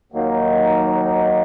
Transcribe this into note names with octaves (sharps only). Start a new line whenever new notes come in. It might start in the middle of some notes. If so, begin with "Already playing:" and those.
D#2 D#3 F#3 A#3 D#4